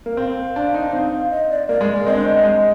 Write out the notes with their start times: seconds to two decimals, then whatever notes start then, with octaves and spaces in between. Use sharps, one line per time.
0.06 A#3
0.17 C4 F5
0.56 D4
0.74 D#4
0.93 C4
1.30 D#5
1.50 D5
1.68 A#3 D5
1.81 G#3
1.93 A#3
2.06 C4 D#5
2.14 D4
2.24 C4
2.44 G#3